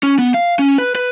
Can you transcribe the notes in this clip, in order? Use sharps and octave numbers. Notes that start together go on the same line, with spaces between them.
C#4
B3
F5
C#4
B4
B4